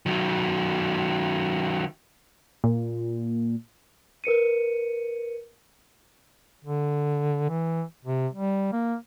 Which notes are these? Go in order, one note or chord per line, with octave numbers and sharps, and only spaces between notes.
D#3 F#3
A#2
A#4 B4 C#7 D#7
D3
E3
C3
G3
A#3